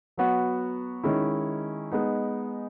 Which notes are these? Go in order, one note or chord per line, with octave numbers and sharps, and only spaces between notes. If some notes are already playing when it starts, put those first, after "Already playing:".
F#3 B3 F#4
D#3 G#3 C#4 E4
G#3 B3 D#4